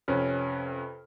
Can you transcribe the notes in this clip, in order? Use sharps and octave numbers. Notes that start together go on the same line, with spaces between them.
F2 C3 C#4 B4 F6